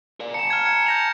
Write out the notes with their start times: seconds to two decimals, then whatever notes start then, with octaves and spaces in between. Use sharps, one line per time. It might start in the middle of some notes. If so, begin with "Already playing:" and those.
0.20 A#4 D5
0.34 A5 A#5 C#7 E7
0.50 F6 G#6
0.65 G#6 C#7
0.86 G6 A#6 F7